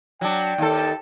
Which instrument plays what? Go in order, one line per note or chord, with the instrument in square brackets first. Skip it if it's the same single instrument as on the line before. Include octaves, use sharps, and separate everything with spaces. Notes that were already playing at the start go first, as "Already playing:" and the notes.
[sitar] F#3 D4 [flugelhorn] G5
[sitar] D#2 A4